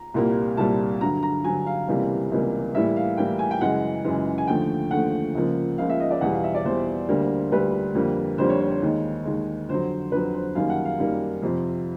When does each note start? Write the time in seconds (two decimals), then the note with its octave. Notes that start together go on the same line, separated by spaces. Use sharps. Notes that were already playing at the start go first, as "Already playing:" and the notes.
Already playing: A#5
0.14 C2 A#2 G3 A#3
0.57 C2 A#2 G3 A#3 A5
1.01 G2 D3 F#3 A#5
1.23 A#5
1.44 G2 D3 F#3 G#5
1.66 F5
1.88 C#2 C3 E3 G3 A#3
2.31 C#2 C3 E3 G3 A#3
2.74 A2 E3 G3 A#3 E5
2.96 F5
3.17 A2 E3 G3 A#3 G5
3.39 G#5
3.51 G5
3.61 F#2 C#3 E3 G#3 F#5
4.05 F#2 C#3 E3 G#3
4.38 G#5
4.48 D#2 D3 F3 A3 G5
4.91 D#2 D3 F3 A3 F#5
5.35 C#2 C#3 F3 A#3
5.78 C#2 C#3 F3 A#3 F5
5.89 E5
6.00 D#5
6.11 D5
6.21 E2 B2 G3 F#5
6.32 F5
6.44 E5
6.55 D5
6.65 E2 B2 G3 C5
7.09 D2 D3 G3 A#3
7.52 D2 D3 G3 A#3 B4
7.95 F2 D3 G3 A#3
8.38 F2 D3 G3 A#3 C5
8.49 C#5
8.60 C#5
8.71 C#5
8.82 D#2 D#3 G#3
9.25 D#2 D#3 G#3
9.69 F2 D3 F#3 C5
10.12 F2 D3 F#3 B4
10.34 C5
10.55 F#2 D#3 G3 A#3 F5
10.69 F#5
10.85 F5
10.99 F#2 D#3 G3 A#3
11.42 F2 C3 F3